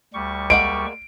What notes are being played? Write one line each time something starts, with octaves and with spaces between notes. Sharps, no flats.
D2 G3 C#6
G#3 A#3 F#5 D7